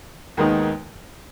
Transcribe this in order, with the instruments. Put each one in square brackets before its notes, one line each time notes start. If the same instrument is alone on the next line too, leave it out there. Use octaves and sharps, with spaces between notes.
[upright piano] D#2 D#3 G#3 B3 D#4